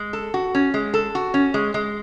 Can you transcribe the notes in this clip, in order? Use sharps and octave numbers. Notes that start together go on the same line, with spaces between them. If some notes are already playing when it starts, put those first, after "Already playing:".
Already playing: G#3
A4
F#4
C#4
G#3
A4
F#4
C#4
G#3
G#3